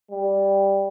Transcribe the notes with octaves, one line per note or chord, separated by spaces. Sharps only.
G3